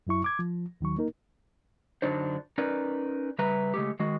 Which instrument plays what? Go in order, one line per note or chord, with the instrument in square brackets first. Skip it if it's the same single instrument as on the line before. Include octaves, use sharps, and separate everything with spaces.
[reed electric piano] F#2 F#3 E4 C#6
D6 G#6
F3
D#2 D#3 F#3 C#6
A#3 D#4 A#4
[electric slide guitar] F#2 D3 F#3 D4 D#4 C5
C#4 D#4 A#4 B4 D5
C#3 G3 B4 E5 A#5
C#3 G#3 A3 G4
D#3 G#3 F#4